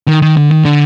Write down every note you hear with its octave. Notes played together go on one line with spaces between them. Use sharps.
D#3
D#3
D3
D#3
D3